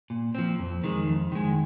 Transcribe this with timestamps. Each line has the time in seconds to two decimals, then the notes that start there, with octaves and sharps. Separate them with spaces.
0.10 A#2
0.35 F3 C4
0.60 F2
0.84 D#3 G#3
1.07 F2
1.32 D#3 G#3